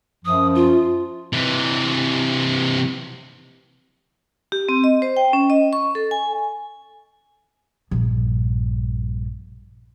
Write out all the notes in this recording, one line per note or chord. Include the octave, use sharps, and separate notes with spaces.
F#2 F3 D#6
F4
C3 E3
G4
C4
D#5
C5
G5
C#4
D#5
C#6
A4
G#5
A#1 G2